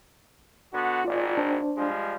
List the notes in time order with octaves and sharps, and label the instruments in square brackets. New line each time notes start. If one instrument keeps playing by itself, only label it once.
[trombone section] D3 B3 F#4
[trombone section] G#1 [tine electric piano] F4 D5
[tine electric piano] D4 C5
[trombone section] F3 G3 G#3